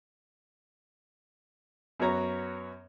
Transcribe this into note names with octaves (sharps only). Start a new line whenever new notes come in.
F#2 B3 F#4 C#5 A#5